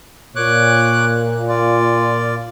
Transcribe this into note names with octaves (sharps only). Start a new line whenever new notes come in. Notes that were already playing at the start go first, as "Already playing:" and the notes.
A#2 C#5 D6 F#6
F4 D5